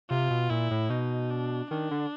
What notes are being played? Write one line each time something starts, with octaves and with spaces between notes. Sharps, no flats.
C3 F4
B2
A#2 E4
A2
B2 D#4
D4
D#3 D4
D3